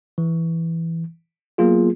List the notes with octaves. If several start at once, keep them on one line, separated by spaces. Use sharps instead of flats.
E3
F#3 A#3 B3 F4 G#4